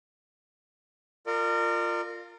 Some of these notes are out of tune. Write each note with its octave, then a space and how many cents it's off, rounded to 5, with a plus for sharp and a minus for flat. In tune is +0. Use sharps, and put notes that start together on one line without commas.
F4 +0 A#4 -25 D5 +35